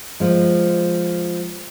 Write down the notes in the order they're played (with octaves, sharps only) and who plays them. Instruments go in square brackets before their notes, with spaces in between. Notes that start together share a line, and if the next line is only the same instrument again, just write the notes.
[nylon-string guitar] F3 G#3